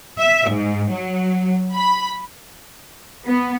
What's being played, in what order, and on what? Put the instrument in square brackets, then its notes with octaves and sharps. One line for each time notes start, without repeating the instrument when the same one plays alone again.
[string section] E5
G#2
F#3
B5
[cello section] B3